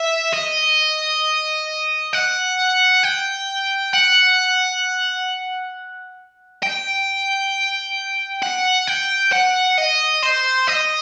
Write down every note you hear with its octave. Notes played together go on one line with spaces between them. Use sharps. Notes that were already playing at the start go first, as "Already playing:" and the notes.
Already playing: E5
D#5
F#5
G5
F#5
G5
F#5
G5
F#5
D#5
C5
D#5